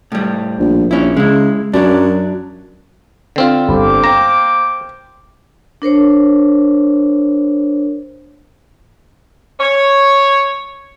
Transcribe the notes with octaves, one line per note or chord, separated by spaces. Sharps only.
A2 G3
A#1
A#1 C#4 E4
C#3 G#3 E4
F#2 F#3 D4
D3 C4 F4
G1 G3 A#3 C5 B5 D6
G5 A#5 E7
D4 A#4 C5 C#5
C#5